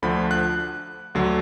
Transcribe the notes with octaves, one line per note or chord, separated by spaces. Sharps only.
D2 D3 F3 B5
F#6
D2 D3 F#3